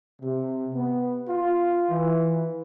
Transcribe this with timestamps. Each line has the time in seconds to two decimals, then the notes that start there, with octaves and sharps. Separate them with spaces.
0.22 C3
0.75 B3
1.28 F4
1.90 E3